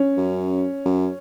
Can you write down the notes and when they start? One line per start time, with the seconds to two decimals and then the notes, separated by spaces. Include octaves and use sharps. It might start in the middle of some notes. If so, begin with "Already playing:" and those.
Already playing: C#4
0.17 F#2
0.86 F#2